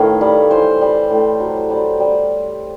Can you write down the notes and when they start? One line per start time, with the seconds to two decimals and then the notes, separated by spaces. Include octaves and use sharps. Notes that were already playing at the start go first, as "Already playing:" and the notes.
Already playing: A2 D#3 B4 C#5 F5
0.21 G3
0.50 E3 C5
0.81 G3
1.10 A2
1.40 F#3
1.70 G3
2.00 G3